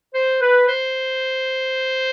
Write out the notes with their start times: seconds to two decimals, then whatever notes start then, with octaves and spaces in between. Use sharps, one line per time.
0.14 C5
0.41 B4
0.67 C5